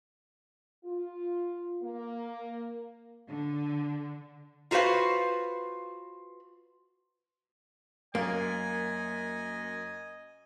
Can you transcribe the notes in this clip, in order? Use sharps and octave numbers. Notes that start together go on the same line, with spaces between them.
F4
A#3
D3
F4 F#4 B4 C5 F5
F#2 A#3 D#5 G#5